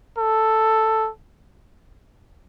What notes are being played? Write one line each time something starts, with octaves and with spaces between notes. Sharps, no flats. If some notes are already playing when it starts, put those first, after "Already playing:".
A4